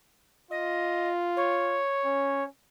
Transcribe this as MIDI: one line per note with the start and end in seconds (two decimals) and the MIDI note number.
0.51 1.83 65
0.51 1.09 75
1.37 2.44 73
2.05 2.47 61